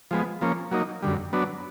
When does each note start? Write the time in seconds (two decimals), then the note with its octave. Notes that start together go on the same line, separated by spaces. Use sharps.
0.11 F3 G#3 B3
0.41 F3 A#3 C#4
0.71 F#3 A#3 D#4
1.03 F#2 D3 G3
1.33 F#3 B3 D4